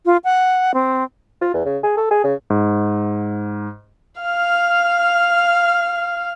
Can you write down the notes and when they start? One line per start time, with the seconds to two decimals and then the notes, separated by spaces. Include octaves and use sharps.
0.06 F4
0.24 F#5
0.74 C4
1.41 F4
1.54 E2
1.65 C#3
1.83 G#4
1.97 A4
2.11 G#4
2.24 C#3
2.50 G#2
4.21 F5 F6